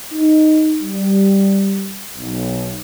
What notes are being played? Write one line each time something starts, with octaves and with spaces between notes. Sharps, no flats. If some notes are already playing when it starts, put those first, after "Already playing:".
D#4
G3
B1